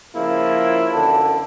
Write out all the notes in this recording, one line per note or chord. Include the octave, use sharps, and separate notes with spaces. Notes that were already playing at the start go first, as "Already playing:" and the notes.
C#3 F3 A#3 E4 F4
F#2 D3 E3 A4